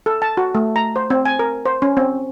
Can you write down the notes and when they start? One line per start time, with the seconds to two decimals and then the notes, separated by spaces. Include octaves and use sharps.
0.06 A4
0.22 A5
0.37 F#4
0.55 A3
0.76 A#5
0.96 C5
1.10 C4
1.25 G#5
1.39 A#4
1.66 C5
1.82 C#4
1.97 C4